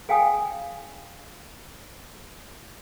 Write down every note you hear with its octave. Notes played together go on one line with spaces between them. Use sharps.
G#4 F5 G5 G#5 D#6